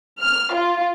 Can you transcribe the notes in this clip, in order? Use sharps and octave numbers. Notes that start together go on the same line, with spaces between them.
F6
F4